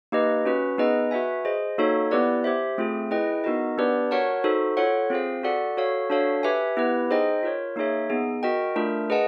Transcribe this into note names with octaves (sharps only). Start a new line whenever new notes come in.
A#3 D#4 G4 B4 D#5
C#4 F#4 B4
B3 D#4 G#4 B4 D#5
F#4 B4 E5 G#5
G#4 C5 D#5
A#3 D#4 F#4 A4 C#5
B3 E4 G4 B4 D5
G4 C5 E5
A3 C4 F4 G#4
E4 G#4 B4 D#5 G5
B3 D#4 F#4 A#4 D#5
B3 D4 G4 B4 D5
F#4 A#4 C#5 F#5 A5
D#4 F#4 A4 C5
F4 A4 C#5 F#5
C4 F4 G#4 C5 F5
F#4 A4 D5 F#5
F#4 A4 C#5 F5
D4 F#4 A4 C#5 F5
G4 B4 E5 G#5
B3 E4 G4 B4
D#4 G#4 C5 D#5 G5
F4 A#4 C#5
A#3 D#4 G#4 C#5 E5
B3 D#4 G#4
F#4 A#4 D#5 G5
A3 D4 F4 A#4
G#4 B4 D#5 F#5 A5